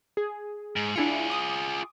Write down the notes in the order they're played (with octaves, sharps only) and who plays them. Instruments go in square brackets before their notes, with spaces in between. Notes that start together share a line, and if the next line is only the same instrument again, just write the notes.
[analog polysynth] G#4
[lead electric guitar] G#2
[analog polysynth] D4 E4 C#7 [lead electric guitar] F4 G#4
[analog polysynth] D6 D#6